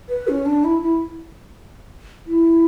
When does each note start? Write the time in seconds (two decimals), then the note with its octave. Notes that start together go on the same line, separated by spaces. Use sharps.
0.09 B4
0.28 C#4
0.45 D4
0.64 E4
0.82 E4
2.26 E4